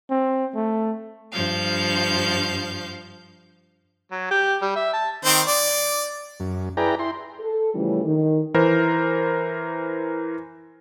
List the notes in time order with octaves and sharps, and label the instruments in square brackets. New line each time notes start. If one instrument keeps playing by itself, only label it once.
[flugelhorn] C4
A3
[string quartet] G2 F3 F5 G6
[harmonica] F#3
G4
G3
E5
A5
D#3 C4 C5
D5
[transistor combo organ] F#2
E4 G#4 B4 D5 G5 A#5
E4 C6
[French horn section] A4
C#3 E3 F3 G3 A3 C#4
D#3
[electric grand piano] E3 A#4 C5